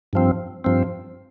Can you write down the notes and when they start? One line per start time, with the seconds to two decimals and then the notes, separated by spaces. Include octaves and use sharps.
0.13 G2 F3 C4
0.64 G2 F3 C4